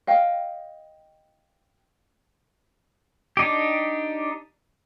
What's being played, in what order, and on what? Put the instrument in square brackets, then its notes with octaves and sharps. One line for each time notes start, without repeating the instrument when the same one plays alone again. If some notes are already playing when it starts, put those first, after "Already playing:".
[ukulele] D#5 F5 G5
[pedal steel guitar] D4 D#4 G4